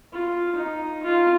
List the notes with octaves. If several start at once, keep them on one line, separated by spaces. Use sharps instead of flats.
F4
D#4
F4